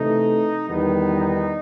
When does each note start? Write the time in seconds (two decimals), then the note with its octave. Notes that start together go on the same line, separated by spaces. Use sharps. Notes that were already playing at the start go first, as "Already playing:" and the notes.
Already playing: C3 E3 A3 D#4
0.67 E2 D#3 G3 B3 D#4
1.20 D#4